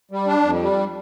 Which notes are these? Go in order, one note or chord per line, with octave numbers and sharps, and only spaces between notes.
G3
D4
F2
G3